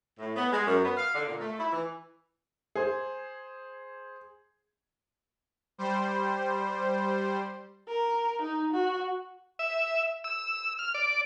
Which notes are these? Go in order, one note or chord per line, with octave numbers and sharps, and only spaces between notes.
A2
B3
G#3
F#2
B3
F5
D3
A#2
A3
E4
E3
G#4 C5
G3 C5
A#4
D#4
F#4
E5
E6
F6
D5